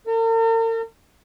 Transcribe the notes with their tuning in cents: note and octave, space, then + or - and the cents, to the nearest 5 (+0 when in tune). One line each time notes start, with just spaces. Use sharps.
A#4 -45